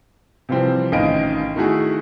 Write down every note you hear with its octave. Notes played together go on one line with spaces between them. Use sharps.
C3 E3 F3 G3 C4
A1 D#3 D#5 F5 D7
D#3 A3 E4 F#4 G#4